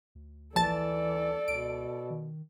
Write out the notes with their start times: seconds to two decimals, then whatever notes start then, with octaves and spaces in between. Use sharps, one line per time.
0.15 D2
0.56 A#1 E3 A4 D5 A5 A6
1.48 C#2 B2 D7
2.10 D#3